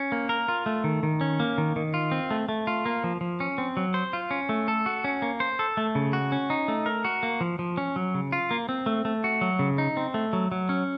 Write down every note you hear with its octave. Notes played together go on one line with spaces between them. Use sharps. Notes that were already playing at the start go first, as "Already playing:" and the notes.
Already playing: C#4
A#3
A#4
F4
A3
D#3
D#3
C#4
A#3
D#3
D#3
F4
C4
A3
A3
F4
A#3
F3
F3
C#4
C4
F#3
C5
F4
C#4
A3
A4
F#4
C#4
A#3
C5
A4
A3
C#3
F#4
C#4
D#4
A3
A#4
F#4
A#3
F3
F3
C#4
F#3
C#3
F4
A#3
C4
A3
A3
F#4
F#3
C#3
D#4
C4
A3
F#3
F#3
C#4